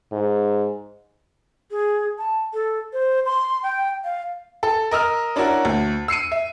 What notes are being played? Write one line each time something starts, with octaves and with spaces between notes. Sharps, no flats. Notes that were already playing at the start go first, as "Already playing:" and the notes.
G#2
G#4
A5
A4
C5
C6
G5
F5
A4
A#4 D#5 E6 F6
C#4 D4 E4 F#4 A#4
D2
E6 C7 C#7 D#7
E5